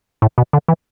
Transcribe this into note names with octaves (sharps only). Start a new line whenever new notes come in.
A2
B2
D3
E3